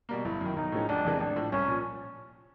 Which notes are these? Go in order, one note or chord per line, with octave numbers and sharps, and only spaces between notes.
B2 G3 A#3
G1 E4
F#2 D#3
B1 D#4
A2 F3 G#3 C#4
F1 D4
E2 C3 E3 G#3
A1 D4
A2 F3
C2 C#4
A#2 F3